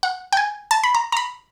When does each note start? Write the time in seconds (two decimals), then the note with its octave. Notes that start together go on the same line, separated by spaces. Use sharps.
0.03 F#5
0.33 G5
0.37 G#5
0.71 A5
0.83 B5
0.95 A#5
1.12 A#5
1.17 B5